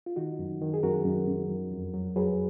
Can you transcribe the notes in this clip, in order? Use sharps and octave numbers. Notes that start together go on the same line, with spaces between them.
F4
D#3 D#4 F#4
F#2
D#3
G#4
F#2 F#4 A#4
F#2
F#2
F#3
F2
F#3
F#3 G#4 B4